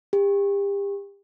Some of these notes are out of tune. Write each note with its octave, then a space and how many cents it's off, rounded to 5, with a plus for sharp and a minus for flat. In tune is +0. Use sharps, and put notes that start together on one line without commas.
G4 +35